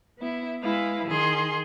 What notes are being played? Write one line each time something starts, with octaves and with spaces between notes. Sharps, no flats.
B3 E4
G#3 E4 B4 F5
D#3 G#4 C6